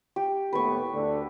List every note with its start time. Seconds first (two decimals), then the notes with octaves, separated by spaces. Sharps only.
0.16 G4
0.53 D#2 A2 B3 B4 C#6
0.94 D2 D3